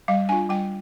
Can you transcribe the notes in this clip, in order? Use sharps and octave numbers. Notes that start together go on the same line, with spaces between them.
G3 F5
D4 F4 G#5
G3 G5